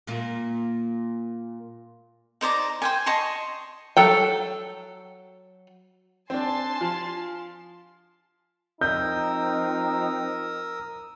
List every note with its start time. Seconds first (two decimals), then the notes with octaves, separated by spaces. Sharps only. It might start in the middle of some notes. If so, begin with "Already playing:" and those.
0.07 A#2 A#3 F4
2.41 D#4 C5 D5 A#5
2.82 C5 G5 G#5
3.06 D#5 A5 C6 C#6
3.97 F#3 A4 G5
6.30 C4 D4 G#5 A5 C6
6.81 F3
8.81 F3 C4 D#4 A#4 D#6 E6 G6